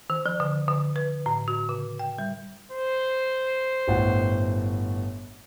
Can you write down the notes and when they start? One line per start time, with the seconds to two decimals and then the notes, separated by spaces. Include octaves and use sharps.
0.10 D#3
0.26 F3
0.40 D3
0.68 D3
0.96 B4
1.26 A2
1.48 F#4
1.69 C#3
1.99 G5
2.19 G3
2.71 C5
3.88 G1 A2 F#5